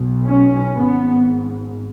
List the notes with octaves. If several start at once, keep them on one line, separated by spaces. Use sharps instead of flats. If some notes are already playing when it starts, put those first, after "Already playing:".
Already playing: B1 B2
C#4
G#1 G#2 B3